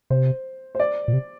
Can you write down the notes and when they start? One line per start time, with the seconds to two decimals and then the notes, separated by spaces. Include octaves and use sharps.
0.10 C3 C5
0.75 C5
0.80 D5
1.08 A#2
1.13 C3